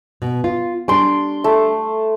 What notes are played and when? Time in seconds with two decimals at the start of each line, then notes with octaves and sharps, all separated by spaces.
0.22 B2
0.44 F4
0.88 G3 D4 C6 D6
1.44 A3